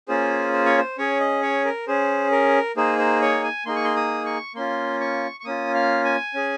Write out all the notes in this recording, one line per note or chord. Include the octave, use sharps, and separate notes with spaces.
A#3 C#4 F4 G#4 C5
C5
C#5
C5
C#4 G#4 C#5
D#5
C#5
A#4
C#4 G#4 C5
A#4
A#3 D#4 G#4 C5
C5
C#5
G#5
A#3 D#4 G#4 C6
C#6
C6
D#6
C#6
A#3 C#4 F4 C6
C#6
C#6
A#3 C#4 F4 D#6
F5
G#5
C#4 G#4